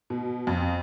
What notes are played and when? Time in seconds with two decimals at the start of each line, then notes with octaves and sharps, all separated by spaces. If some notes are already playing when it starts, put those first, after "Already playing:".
0.10 B2
0.47 F2